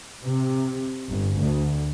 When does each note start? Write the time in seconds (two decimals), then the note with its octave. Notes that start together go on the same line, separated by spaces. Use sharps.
0.24 C3
1.08 G1
1.38 D2